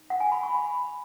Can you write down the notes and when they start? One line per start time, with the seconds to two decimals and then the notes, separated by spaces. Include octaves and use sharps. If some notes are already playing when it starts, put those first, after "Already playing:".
Already playing: D#4
0.10 F#5
0.20 G#5
0.32 B5
0.43 C#6
0.55 B5